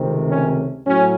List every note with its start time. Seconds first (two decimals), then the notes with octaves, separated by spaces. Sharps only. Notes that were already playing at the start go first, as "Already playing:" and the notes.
Already playing: C#2 C3 D#3 A3 C4
0.29 C#4
0.87 A2 F#3 C#4